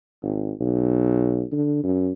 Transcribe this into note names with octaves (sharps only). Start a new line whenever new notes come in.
G#1
B1
D3
F#2